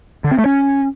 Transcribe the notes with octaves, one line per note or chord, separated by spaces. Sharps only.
D3
C4
A3
C#4